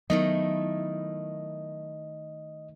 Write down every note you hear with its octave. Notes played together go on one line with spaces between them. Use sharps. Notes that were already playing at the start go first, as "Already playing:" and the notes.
D#3 F#3 A3 B3 E4 D#5